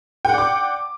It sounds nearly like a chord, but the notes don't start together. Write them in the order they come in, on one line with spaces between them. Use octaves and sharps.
G5 F#5 D5 D6